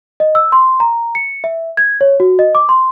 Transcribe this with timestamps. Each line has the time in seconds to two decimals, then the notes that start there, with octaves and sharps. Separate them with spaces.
0.20 D#5
0.35 E6
0.52 C6
0.80 A#5
1.15 C#7
1.44 E5
1.77 G#6
2.01 C#5
2.20 F#4
2.39 D#5
2.55 D6
2.69 C6